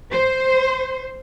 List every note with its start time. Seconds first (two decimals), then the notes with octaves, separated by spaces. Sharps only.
0.12 C5